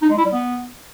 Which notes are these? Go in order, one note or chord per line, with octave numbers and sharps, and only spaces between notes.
D#4
G#3
E4
G3
B3